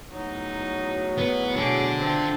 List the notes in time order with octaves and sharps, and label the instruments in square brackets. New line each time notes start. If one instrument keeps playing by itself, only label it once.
[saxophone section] E2 A2 F#3 [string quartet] D#4
[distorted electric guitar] B3 B4
[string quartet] B2 G#4 D6 [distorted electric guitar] D4 A4
[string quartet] C4 F4 A5